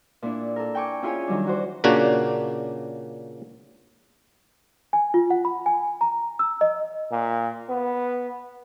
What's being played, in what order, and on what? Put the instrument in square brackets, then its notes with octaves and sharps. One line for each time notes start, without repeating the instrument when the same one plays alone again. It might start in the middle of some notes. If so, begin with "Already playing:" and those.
[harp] A#2 D4 E4
A4 A#4
G5 G#5 C#6 D6
C#4 E4 F4 G#4 C#5 G#5
D#3 F#3 G3 D4
E3 F#4 C5
[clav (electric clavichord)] A#2 C#3 A#3 D4 F#4
[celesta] G#5
F4
F#5
B5
G#5
A#5
E6
D#5
[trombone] A#2
B3